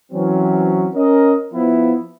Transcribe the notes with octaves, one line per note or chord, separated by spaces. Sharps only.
E3 F#3 C4 C#4
C#4 A#4 D#5
F3 B3 E4